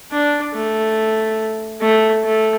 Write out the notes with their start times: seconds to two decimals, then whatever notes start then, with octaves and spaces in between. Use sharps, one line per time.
0.12 D4
0.54 A3
1.81 A3
2.24 A3